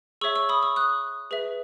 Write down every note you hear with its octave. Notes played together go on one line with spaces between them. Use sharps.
G#4 C#5 E5 C#6 E6
C#6 E6
B5 D#6
C#6 E6
D#6 F#6
G#4 B4 E5